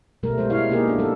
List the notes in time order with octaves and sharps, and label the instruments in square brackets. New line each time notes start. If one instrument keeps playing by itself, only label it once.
[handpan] B2 G3 A3 A#4
G3 G#3 C5
E4 C#5 F5
A#3 B3 D#4 G4 G#4 A#4
D4 F4
G3 A4